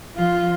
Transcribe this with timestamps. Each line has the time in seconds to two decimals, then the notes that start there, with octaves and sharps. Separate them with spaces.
0.15 F3 F4